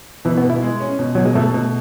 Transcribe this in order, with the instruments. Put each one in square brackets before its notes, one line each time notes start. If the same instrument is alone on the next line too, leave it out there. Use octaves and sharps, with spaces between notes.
[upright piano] B2 [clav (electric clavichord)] E3
[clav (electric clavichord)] B3
[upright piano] B2
[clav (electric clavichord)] E4
[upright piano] G#3
C#4
B2
[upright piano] B2 [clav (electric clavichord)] F#3
[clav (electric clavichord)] G#3
[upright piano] B2 [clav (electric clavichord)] A3
[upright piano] B2